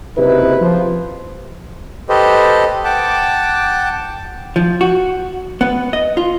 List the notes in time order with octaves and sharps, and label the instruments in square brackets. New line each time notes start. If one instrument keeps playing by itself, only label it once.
[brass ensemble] F#1 C3 D#4 E4 B4
F3
[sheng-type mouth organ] G4 A4 B4 C5 D#5
F#5 G5 A5 D6
[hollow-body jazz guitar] F3
F#4
B3
D#5
F4